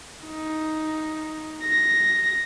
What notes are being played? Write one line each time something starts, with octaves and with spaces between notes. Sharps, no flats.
D#4
A#6